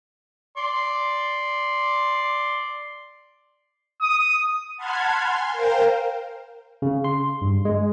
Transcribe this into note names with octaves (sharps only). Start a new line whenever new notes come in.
D5 C6
D#6
F#5 A5 B5 C6 F6 G#6
G#5 C6
A#4 C5 F5 G5
C#3
C6
G2
G#3